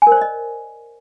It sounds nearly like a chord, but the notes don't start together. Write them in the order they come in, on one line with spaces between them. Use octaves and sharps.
G#5 A#4 C5 D5 D#5